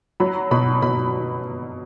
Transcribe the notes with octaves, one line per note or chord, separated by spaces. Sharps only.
F#3 B5
B2 B5
B2 B5